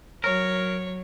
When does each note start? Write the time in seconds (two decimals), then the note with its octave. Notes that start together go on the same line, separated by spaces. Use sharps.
0.24 F#3 A#4 C#5